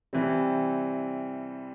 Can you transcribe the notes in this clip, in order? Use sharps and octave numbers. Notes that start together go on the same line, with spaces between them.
C3 E3 G3 C4